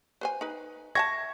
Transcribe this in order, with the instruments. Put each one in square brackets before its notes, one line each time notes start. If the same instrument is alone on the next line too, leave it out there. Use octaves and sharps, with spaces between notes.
[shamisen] B4 C5 G#5
D#4 B4
[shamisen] E5 G5 A5 [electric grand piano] C#6 G#6 A#6